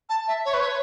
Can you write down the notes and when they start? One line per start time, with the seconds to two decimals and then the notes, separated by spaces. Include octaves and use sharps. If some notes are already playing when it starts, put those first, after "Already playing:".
0.10 A5
0.28 E5
0.45 C#5
0.54 B4
0.60 C#5